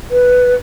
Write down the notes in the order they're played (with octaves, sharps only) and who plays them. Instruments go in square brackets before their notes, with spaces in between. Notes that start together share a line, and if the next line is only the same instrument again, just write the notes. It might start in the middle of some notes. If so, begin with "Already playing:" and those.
[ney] B4